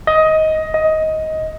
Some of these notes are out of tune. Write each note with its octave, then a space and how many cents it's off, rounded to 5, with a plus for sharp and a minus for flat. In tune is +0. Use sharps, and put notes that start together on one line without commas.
D#5 +15
D#5 +15